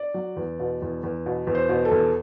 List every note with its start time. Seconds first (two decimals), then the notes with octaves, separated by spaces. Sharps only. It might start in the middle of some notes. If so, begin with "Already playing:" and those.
Already playing: D5
0.14 F#3
0.36 E2
0.60 B2
0.82 E2
1.03 E2
1.26 B2
1.47 E2
1.55 C5
1.69 B2
1.85 A4
1.91 E2